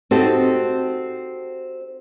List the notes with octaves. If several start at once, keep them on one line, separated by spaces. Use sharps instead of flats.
C4 D#4 F#4 G4 A4 C5